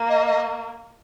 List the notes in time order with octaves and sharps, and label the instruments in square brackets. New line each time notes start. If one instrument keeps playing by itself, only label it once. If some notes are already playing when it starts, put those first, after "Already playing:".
Already playing: [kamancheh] A#3
[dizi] D#5
D#5